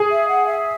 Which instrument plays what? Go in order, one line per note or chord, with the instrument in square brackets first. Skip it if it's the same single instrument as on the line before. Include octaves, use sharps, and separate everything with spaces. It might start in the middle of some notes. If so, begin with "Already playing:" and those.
Already playing: [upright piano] G#4
[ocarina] E5
F#5
E5